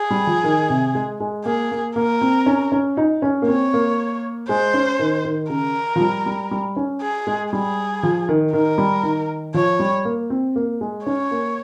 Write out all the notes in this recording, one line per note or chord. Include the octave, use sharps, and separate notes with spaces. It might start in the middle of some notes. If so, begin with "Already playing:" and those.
Already playing: G#4
G3
F3
D#3
C3
G#3
G#3
A#3 G#4
A#3
A#3 A#4
C4
C#4
C#4
D#4
C#4
A#3
C4 C#5
A#3
G#3 C5
C#4
D#3
D#3
C#3 A#4
F3
G3
G3
G3
C#4
G#4
G#3
G3 G#4
F3
D#3
D#3 A#4
G3
D#3
F3 C#5
G3
A#3
C4
A#3
G#3
C#4 C#5
A#3